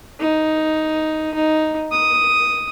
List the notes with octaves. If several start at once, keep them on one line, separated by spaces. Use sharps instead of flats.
D#4
D#4
D#6